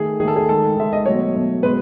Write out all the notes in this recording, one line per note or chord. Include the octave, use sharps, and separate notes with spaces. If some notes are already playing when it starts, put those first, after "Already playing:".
Already playing: D#3 A3 G#4
D#3 A3 G#4
A4
G#4
D#3 G#3 A4
D#3 G#3 E5
D#5
B2 F#3 A3 C#5
B2 F#3 A3
B2 G#3 B4